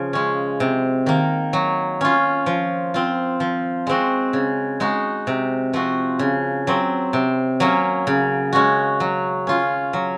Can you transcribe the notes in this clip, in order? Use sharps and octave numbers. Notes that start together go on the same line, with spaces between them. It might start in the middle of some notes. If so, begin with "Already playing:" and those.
Already playing: C#3 F3 F4
G#3 C#4
C3
D#3 A#3
F#3
C#4 F4
F3
C4 F4
F3
G#3 C4 F#4
C#3
G#3 D#4 F#4
C3
F3 C4 F#4
C#3
F#3 C4
C3
F#3 A#3 C#4
C#3
G#3 C#4 F#4
F#3
C#4 F4
F#3